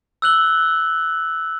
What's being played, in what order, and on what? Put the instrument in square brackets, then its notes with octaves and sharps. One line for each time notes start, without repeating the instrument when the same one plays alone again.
[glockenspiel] E6 F#6 F#7 G7